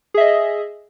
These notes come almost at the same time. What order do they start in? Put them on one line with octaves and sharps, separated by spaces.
G#4 E5 D#5